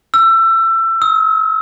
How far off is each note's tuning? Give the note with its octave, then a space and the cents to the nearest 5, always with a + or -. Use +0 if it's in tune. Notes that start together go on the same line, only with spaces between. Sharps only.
E6 +25
E6 -35